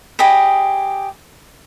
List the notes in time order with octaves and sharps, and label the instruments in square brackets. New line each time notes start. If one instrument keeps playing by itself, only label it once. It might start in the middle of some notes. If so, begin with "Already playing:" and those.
[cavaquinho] G4 G#4 D#5 B5